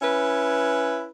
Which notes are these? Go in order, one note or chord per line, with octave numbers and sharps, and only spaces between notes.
C#4 E4 B4